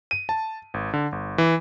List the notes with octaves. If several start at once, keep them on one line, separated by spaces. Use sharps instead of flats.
D#7
A5
G#1
D3
G1
E3